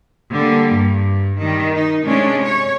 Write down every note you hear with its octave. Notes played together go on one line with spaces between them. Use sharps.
D3 G3 A#3
G2
D#3 G3
D#4
C3 G#3 C#4 D4
C#5